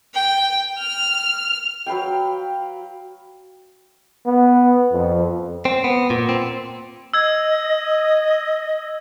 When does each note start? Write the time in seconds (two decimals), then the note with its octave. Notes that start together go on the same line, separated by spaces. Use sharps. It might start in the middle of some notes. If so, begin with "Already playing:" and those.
0.14 G5
0.79 F6
1.86 F#3 B4 F5 G5
4.26 B3
4.93 F2
5.65 C4
5.84 B3
6.10 A#2
6.29 C4
7.14 D#5 E6 G#6